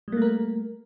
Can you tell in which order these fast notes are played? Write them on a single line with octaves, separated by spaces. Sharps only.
G3 A#3 A3 A#4